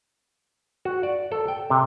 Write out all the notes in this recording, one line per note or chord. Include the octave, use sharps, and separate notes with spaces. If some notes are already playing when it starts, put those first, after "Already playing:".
F#4
D5
A4
G5
C3